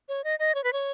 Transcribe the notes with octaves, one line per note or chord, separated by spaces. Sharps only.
C#5
D#5
D#5
C#5
B4
C#5